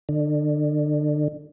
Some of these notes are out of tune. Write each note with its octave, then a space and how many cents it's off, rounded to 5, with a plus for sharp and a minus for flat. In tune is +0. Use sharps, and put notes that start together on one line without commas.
D3 +30